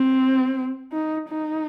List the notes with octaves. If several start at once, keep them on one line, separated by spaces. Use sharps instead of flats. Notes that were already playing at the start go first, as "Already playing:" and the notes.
Already playing: C4
D#4
D#4